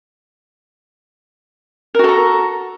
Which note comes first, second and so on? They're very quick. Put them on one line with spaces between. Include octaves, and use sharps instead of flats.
A#4 F#4 A4 A#5